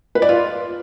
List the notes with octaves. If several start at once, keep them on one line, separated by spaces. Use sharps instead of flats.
B4
D5
F4